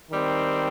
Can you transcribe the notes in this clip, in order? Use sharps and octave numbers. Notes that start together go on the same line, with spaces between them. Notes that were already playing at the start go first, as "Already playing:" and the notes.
D#3 G3 C4